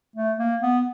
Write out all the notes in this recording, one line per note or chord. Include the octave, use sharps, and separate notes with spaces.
A3
A#3
B3